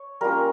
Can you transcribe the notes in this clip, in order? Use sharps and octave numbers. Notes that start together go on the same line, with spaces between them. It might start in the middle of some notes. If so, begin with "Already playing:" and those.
Already playing: C#5
G3 A#3 C#4 F4 A#4